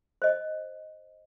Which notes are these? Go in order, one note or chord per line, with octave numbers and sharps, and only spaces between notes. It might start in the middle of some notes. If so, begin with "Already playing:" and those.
C5 D#5